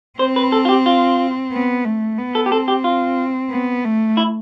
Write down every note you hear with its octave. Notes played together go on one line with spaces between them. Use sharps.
C4 C5
B4
A4
F4
G4
F4
B3
A3
B3
A4
G4
C4 A4
G4
F4
B3
A3
E4